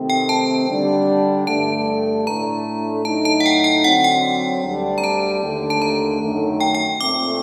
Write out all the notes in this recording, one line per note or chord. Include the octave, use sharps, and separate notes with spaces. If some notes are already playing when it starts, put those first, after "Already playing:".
Already playing: C3 D#3 A3 C4
G5
A5
D3 G3 D4
G2 D3 A3 A5
A2 A3 D4 A#5
A2 F#3 A3 D#4 A5
A5
F#5
G5
G5
D3 F#3 C4 F#5
G5
D2 D3 G3 D4
A#5
A5
D#2 D3 A3
A5
A#5
F#2 D#3 A3
G5
G5
A#2 A3 C4 D6